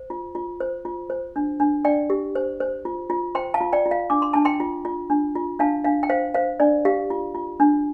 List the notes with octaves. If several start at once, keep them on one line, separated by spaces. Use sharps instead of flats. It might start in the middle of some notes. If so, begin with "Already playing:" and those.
Already playing: C5
F4
F4
C5
F4
C5
D4
D4
D4 D5 G5
G4
C5
C5
F4
F4
C5 G5 C6
F5 A5
F4
D5 G5
F4
F5
D4 D6
C6
D4 A5
G5 C6
F4
F4
D4
F4
D4 F5 A5
D4 F5
G5
C5 F5
C5 F5
D4 D5
G4 F5
F4
F4
D4